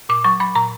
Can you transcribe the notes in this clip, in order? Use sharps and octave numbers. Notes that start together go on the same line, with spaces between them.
A#2 D6
F#3 C#6
F#3 B5
A#2 A#5